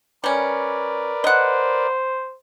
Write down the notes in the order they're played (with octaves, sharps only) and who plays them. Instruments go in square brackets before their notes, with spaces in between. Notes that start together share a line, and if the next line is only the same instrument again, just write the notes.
[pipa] G3 C#4 [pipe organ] A#4 B4 D5
[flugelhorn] C5 [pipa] D#5 F#5